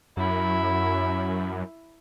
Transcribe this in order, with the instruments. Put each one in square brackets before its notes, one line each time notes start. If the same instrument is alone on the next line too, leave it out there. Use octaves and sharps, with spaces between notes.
[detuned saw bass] F#2 [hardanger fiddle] E4